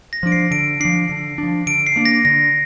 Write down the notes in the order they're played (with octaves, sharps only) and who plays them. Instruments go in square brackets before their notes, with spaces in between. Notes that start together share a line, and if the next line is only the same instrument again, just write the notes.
[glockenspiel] A#6
[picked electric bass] F3 D4 [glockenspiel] D7
[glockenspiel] C7
[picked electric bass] D3 [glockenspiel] D7
[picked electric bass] F3 D4 [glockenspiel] C7
[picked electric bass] D3
F3 D4
[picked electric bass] D3 [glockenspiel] D7
[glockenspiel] C7
[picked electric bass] A#3 D4
[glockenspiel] A#6
[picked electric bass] D3 [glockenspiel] A#6